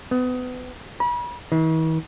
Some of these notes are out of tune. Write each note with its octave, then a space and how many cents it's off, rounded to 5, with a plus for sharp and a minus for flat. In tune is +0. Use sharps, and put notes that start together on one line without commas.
B3 +30
B5 -35
E3 -45